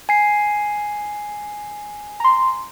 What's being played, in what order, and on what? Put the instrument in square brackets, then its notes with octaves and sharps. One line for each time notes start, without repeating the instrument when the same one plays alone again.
[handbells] G#5 C7
[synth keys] A#5 C6